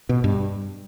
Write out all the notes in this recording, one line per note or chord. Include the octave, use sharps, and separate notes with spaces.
B2
G2